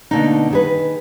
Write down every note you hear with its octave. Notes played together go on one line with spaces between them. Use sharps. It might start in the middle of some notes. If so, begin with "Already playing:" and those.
B2 D3 A3 A#3 D#4
D#3 G#4 B4